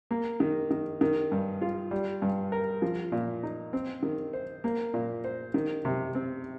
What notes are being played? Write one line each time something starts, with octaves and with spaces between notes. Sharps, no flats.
A#3
D#3
D#3
D#3
G2
F4
G3
G2
A#4
F3
A#2
D#4
C4
D#3
C5
A#3
A#2
C5
D#3
C3
C4